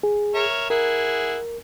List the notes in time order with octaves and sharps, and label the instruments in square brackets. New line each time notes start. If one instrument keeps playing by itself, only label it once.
[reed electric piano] G#4
[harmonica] A#4 C#5 E5
[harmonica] E4 G#4 F#5 [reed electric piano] A#4